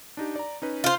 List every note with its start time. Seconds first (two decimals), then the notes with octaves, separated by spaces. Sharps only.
0.17 D4 D#4 G4
0.36 D5 A#5
0.62 C#4 D#4 B4
0.84 F4 C5